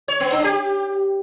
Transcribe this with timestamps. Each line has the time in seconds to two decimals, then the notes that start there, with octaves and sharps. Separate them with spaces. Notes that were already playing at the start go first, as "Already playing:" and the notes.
0.08 C#5
0.20 B3
0.32 D4
0.44 G4